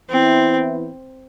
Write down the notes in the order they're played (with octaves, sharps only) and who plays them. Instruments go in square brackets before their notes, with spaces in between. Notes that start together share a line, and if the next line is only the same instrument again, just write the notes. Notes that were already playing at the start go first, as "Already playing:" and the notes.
[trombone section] E3 B3 E4 [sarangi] C4